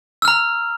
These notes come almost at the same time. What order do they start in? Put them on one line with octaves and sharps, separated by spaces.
E6 F6 A#5